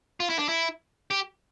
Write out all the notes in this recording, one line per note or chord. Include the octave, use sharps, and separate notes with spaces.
F4
E4
D4
E4
G4